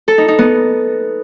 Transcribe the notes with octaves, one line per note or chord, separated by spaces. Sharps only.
A4
D#4
D#4
B3